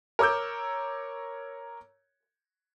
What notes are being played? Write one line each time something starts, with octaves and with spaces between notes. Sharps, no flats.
A#4 C#5 D6 E6 G6